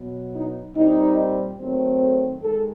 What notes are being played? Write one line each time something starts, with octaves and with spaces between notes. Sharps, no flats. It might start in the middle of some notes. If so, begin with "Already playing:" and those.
Already playing: B2 F#3 B3
D#4
A#2 G3 C4 D#4
D#3 F#3 A3 C4
A4
D#3 G#3 A4